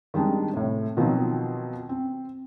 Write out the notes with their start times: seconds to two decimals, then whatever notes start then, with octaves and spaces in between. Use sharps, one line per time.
0.14 D#3 G3 G#3 C4 D4
0.53 A2 C3
0.97 B2 D#3 F3 F#3 C4
1.89 C4